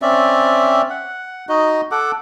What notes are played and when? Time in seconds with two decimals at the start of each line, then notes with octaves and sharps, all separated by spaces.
0.02 C4 C#4 D5 E5
0.90 F#5
1.49 D#4 F#4 D#5
1.91 A4 F#5 D6